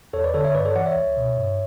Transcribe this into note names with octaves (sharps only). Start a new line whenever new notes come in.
E2 A4 C#5
B4 D5
D3 A4 C#5
C#5 E5
G2 B4 D5
A4 C#5
E3 D5 F#5
C#5 E5
C#2
B2
G2